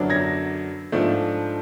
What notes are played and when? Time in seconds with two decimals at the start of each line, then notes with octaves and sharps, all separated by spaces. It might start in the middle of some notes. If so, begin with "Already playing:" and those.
Already playing: F#2 D3 F#3 B3 D4
0.10 G#6 A#6
0.92 G#2 F3 A3 D4